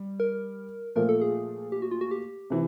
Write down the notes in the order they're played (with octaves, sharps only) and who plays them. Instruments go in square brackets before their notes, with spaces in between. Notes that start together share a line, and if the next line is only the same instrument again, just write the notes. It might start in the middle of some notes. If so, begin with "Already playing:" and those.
Already playing: [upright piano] G3
[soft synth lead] A#4
[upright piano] A#2 F3 A3 [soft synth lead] A#4
[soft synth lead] A4
G#4
G4
F#4
F4
F#4
G4
[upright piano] C3 E3